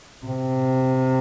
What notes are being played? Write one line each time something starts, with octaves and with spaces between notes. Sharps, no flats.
C3